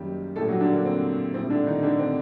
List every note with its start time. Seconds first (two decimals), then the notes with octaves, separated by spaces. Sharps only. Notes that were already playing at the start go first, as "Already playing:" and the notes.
Already playing: F#1 F#2 D#3 F#3 G3 G4
0.36 A#1 A2 G3 A3 A4
0.48 F#3 F#4
0.60 D3 D4
0.72 A#3
0.85 C4
1.34 A#1 A2 G3 C4
1.50 D3 D4
1.66 D#3 D#4
1.83 D3 D4
1.99 C4